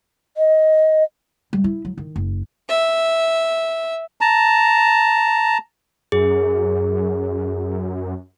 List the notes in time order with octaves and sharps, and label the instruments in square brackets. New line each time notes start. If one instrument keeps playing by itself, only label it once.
[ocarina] D#5
[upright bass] G3
E4
F#3
D#3
F#1
[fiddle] E5
[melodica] A5 A#5
[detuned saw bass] F#2 [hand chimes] G#4